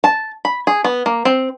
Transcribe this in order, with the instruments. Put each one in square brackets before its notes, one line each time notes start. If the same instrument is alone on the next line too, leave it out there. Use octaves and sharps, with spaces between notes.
[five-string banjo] A5
B5
G#4
B3
A#3
C4